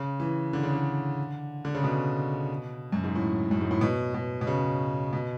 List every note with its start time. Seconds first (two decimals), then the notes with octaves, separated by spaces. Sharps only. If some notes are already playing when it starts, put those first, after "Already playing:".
Already playing: C#3
0.20 E3
0.53 D3
0.63 C#3
0.73 D3
1.65 D3
1.75 C#3
1.84 B2
2.92 F#2
3.04 G#2
3.15 A2
3.51 F#2
3.61 G#2
3.71 A2
3.81 B2
4.14 B2
4.41 B2
4.47 C#3
5.13 B2